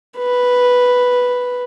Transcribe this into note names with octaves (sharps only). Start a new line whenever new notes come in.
B4